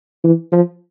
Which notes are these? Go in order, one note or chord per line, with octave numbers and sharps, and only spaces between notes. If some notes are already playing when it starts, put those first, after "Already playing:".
E3
F3